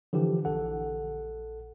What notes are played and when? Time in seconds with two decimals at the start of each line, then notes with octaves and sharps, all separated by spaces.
0.13 D3 E3 F3 G4
0.45 A#1 A4 F#5